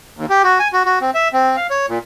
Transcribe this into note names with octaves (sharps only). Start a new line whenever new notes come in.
D#2
G4
F#4
G#5
F#4
F#4
C4
E5
C4
F5
C#5
A#2